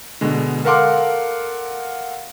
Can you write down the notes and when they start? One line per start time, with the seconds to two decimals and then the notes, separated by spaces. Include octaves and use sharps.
0.21 B2 D3 G#3
0.65 A4 A#4 F5 F#5 C6 D6